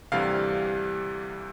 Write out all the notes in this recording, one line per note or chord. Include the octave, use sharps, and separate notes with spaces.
D2 C3 E3 G3 F5